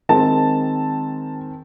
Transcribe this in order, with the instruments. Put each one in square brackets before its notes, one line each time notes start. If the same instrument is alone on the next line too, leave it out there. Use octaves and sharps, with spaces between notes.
[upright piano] D#3 G#3 C4 A5